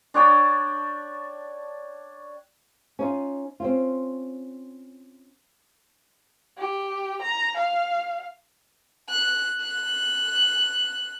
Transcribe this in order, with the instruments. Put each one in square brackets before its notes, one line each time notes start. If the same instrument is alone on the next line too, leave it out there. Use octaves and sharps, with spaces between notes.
[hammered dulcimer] D4 C#5 G5 A5
[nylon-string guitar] C#4 D#4 F4
C4 C#4 F4
[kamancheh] G4
A#5
F5
[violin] F#6
F#6